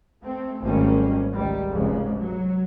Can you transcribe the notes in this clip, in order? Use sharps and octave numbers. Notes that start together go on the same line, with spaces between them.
A3 C4
G#1 D#3 G3 A3 A#3 C#4
C#2 D#3 G3
F1 G#2 C#3
F#3